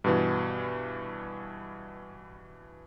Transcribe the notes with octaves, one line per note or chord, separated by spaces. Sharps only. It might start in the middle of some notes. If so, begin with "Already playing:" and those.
G2 B2 E3